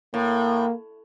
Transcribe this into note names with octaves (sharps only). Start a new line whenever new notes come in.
A2 A#3